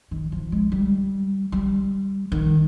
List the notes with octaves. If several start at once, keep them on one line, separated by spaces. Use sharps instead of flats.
D#3
F3
G#3
G3
G3
D#3